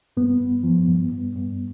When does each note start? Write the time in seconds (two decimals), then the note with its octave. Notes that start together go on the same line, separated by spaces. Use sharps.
0.17 G2 B3
0.40 G2
0.64 F3
0.88 G2
1.12 G2
1.35 G2